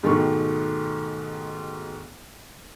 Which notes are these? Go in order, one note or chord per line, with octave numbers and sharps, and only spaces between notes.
G#2 B2 D#3 A3 G4 C#6